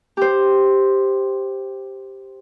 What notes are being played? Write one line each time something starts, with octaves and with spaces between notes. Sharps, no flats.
G4 C5